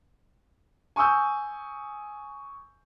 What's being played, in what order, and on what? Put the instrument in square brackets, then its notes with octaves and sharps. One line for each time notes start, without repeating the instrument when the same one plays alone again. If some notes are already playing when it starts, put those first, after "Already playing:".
[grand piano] G#5 C#6 D#6 E6 G6